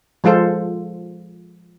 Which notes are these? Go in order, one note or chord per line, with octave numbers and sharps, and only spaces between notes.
F3 G#3 F4 A4 C5